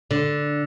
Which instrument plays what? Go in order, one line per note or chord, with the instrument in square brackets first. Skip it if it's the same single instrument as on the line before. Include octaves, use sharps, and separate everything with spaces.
[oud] D3